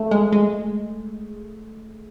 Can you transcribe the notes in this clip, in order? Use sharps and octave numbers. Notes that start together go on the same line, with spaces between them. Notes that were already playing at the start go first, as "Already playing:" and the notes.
Already playing: A3
G#3
G#3